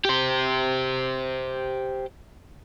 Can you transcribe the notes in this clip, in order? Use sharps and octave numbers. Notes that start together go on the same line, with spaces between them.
G4 C5